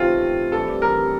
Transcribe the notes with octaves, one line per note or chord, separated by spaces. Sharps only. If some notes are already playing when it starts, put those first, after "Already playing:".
Already playing: C3 E3 A3 C4 F4
G2 E3 G3 A4
A#4